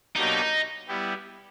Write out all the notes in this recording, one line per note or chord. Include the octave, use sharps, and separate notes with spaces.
B2 F#3 A#3 D4 D#4 G4
G3 B3 E4 G4